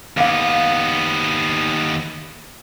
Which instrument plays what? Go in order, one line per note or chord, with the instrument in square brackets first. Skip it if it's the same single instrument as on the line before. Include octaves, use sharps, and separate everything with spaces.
[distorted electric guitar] D#2 B3 [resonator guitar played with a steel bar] A#3 F5